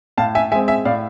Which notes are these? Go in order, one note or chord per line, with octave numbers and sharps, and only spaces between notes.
A2 F5 A5
E5 G#5
G#3 C4 E5 G#5
E5 G#5
A2 D5 F5